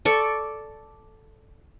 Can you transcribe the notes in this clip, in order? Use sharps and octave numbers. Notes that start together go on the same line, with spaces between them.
A4 D5 C#6